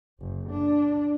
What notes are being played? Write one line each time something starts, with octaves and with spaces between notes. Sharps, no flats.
F#1
D4